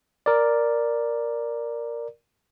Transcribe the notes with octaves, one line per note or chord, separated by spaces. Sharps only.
A#4 D5